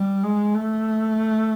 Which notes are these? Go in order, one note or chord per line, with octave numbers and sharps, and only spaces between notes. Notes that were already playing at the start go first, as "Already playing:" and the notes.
Already playing: G3
G#3
A3